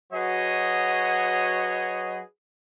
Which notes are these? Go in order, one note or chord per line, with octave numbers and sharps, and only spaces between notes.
F#3 F#4 G#4 B4 C#5 D#5